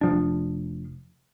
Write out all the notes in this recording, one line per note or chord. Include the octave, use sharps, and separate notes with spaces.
F1 F2 F3 D4